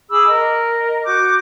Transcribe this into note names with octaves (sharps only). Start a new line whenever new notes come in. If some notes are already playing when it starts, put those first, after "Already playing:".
G#4 B5 D6 E6
A#4 D#5
F#4 D6 G6